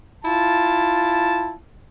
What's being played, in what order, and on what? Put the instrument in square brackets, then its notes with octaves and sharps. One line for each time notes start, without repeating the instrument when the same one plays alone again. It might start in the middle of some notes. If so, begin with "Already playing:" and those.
[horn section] E4 F4 A5